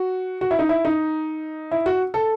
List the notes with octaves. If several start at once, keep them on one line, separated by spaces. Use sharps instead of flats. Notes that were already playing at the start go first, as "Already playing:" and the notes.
Already playing: F#4
F#4
E4
D#4
E4
D#4
E4
F#4
A4